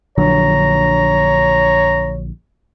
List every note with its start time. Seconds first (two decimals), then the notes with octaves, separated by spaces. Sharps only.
0.18 A#1 D3 F#3 C#5 A#5